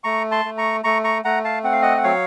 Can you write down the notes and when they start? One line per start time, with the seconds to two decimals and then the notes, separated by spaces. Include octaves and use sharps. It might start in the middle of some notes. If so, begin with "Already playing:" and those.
0.04 A3 A#5 C#6
0.31 A5 C6
0.45 A3
0.58 A#5 C#6
0.84 A3 A#5 C#6
1.04 A#5 C#6
1.25 A3 F#5 A#5
1.44 F5 A5
1.64 C4 F#5
1.73 F5
1.82 D#5 F#5
1.97 F#5
2.04 F#3 C#5 F5